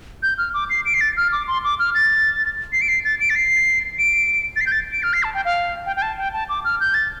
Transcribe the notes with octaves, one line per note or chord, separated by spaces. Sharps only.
G6
F6
D6
C7
D7
C7
A6
F6
D6
C6
D6
F6
A6
C7
D7
C7
A6
D7
A6
C7
D7
A6
C7
G6
A6
D7
F6
C7
A5
G5
F5
G5
G5
A5
G5
A5
D6
F6
G6
A6